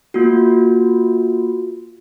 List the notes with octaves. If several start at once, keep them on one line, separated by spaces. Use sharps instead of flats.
A#3 F4 F#4